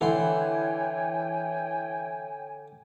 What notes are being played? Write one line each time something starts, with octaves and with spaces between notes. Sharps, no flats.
D3 E3 C#5 G5 G#5 C6